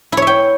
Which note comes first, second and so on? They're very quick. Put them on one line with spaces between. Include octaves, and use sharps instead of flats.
E4 C#5 E5 G5